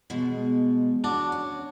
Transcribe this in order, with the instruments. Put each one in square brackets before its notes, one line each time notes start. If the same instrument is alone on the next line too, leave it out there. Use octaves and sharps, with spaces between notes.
[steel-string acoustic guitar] B2 F3 G#3
[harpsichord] D4 [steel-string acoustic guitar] F#4
[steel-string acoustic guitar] C#4